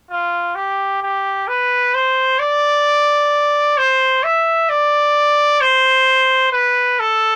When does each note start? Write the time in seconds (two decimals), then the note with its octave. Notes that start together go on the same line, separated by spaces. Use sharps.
0.10 F4
0.55 G4
1.02 G4
1.47 B4
1.94 C5
2.39 D5
3.78 C5
4.24 E5
4.69 D5
5.61 C5
6.52 B4
6.99 A4